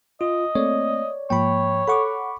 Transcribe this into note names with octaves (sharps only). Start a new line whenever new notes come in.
F4 D#5
A3 A#3 C4 C#5 D5
G#2 F3 A#3 C#5 G5 B5
A4 F#5 B5 C#6 D6